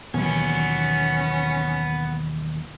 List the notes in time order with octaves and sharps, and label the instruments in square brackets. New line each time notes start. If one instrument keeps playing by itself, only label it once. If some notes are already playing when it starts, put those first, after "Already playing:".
[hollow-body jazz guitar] D#2 B2 [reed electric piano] E3 F#3 [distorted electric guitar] B3 G#5 [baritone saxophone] C#4